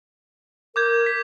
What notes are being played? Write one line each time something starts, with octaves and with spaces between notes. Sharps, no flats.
A#4 D6 G6 G#6
B6